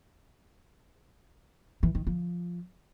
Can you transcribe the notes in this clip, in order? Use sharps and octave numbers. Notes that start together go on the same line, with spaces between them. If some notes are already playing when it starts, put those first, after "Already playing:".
E3
D#3
F3